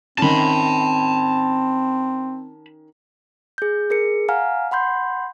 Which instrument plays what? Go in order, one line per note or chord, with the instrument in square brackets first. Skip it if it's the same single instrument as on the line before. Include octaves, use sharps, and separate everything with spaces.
[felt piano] D#3 C#4 [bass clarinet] C4 [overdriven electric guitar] A5 B5
[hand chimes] G#4 G6
G#4 A#4 C#7
F5 F#5 G#5 A#5 F6
F#5 B5 C6 G6